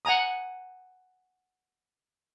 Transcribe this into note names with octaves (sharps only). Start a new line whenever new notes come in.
F#5 G#5 A#5 D#6